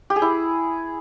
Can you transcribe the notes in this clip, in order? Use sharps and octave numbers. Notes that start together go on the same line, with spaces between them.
G4
G#4
E4